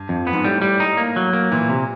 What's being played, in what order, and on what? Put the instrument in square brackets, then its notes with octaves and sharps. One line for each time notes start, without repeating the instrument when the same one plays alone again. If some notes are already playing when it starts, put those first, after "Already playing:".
Already playing: [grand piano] G2
[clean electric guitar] F2
B3
[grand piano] G#2
[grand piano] A2 [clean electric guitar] G3
[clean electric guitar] G3
D#4
A#3
F#3
A#3
[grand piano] A#2 [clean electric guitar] E3
[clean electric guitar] C3